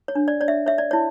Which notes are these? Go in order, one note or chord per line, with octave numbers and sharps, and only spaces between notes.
C#5
D4
D5
C#5 D5
E5
C#5 E5
D5
E4 C#5